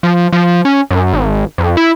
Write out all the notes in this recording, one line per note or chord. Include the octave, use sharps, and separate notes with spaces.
F3
F3
C#4
F#2
G#1
F2
E4